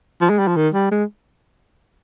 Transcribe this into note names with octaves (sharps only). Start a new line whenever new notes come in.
F3
G#3
G3
F3
D#3
G3
G#3